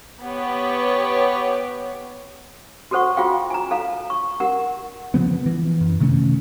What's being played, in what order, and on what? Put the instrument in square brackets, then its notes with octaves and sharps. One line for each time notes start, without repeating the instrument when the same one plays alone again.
[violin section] B3 G4 C#5
[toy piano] F#4 G4 A4 C5 F#5 C#6
F4 F#4 G#4 F5 G5
G#5 A#5
A4 F5 A#5
C#6
G4 A#4 F#5
[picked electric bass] C#3 F3 B3
E3
F#2
C3 D#3 A3 C#4